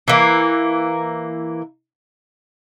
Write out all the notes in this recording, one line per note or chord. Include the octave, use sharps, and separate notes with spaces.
E3 A#3